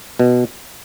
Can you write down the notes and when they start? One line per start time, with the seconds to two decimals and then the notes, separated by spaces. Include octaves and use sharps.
0.19 B2